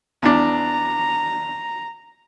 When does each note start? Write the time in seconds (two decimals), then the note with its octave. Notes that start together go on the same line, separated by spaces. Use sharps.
0.22 E2 D4 A#5